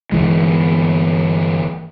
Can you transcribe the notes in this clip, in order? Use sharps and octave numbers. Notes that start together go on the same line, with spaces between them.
G1 C#2 E3 G#3